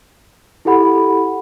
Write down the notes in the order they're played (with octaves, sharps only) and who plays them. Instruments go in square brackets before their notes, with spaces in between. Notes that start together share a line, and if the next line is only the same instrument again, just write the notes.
[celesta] E4 G4 A4 F#5 B5